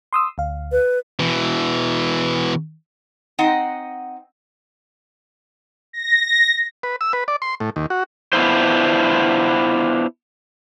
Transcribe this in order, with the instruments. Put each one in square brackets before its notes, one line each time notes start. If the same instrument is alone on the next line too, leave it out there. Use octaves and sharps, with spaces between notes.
[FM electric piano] C6 D#6 E6
D2 F5
[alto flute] B4
[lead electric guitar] B2 E3
[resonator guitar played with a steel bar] C4 D#4 D#5 F#5
[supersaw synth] A#6
[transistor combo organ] B4
E6
B4
D5
C6
A2
D#2
F#4
[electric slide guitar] B3 D4 E4 F4 C5